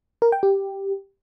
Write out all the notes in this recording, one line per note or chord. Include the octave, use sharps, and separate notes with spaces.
A#4
G5
G4